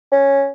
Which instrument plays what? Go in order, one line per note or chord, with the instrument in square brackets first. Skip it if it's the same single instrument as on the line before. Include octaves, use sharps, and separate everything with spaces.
[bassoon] C#4